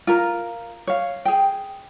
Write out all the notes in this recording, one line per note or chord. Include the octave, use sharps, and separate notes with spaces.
F4 A#4 A#5
C#5 F5
G#4 G5